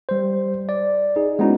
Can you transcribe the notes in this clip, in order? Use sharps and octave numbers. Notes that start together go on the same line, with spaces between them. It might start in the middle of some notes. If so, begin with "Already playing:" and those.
G3 C5
D5
D#4 G#4
G#3 B3 C#4 D#4 E4 F#4